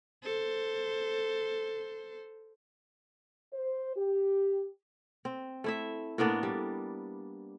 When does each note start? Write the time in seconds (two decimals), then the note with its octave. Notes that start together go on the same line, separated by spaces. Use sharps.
0.23 A4 C5
3.53 C5
3.97 G4
5.25 C4
5.64 A3 E4 E5
6.18 A2 A#3 B3 D4
6.43 G3